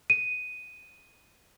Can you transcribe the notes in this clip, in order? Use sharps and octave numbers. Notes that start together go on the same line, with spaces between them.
D#7